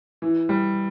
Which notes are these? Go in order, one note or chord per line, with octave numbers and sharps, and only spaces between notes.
E3
G3